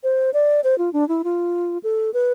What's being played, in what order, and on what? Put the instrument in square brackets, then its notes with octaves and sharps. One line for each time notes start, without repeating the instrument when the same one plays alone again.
[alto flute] C5
D5
C5
F4
D4
E4
F4
A4
B4